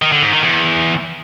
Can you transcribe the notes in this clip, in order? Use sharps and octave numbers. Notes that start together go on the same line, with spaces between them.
D#3
D3
G#2
D#3
E2